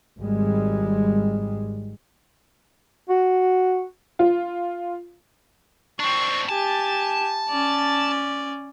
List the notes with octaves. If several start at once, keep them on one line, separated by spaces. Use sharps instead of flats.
G#1 G3 G#3
F#4
F4
C4 D4 C#6
G4 G#5 A5
C#4 D5